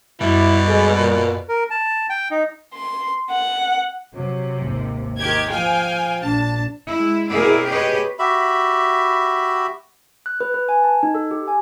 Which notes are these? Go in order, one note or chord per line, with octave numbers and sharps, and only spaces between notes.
F#2 B2 G3 E4
G#3 A4
A#2
A#4
A5
G5
D#4
C6
F#5
C3 F#3
G#1 D#2
D#3 G4 G#6
F3 F5 G5 G#5
A#1 D4 A5
G#3 E4
B2 C4 E4 G#4 A#4 D5
G4 G#4 B4 C#5 D#5
F#4 G4 E5 B5
F#6
B4
B4
G#5
A5
D#4
A4
G4
G#5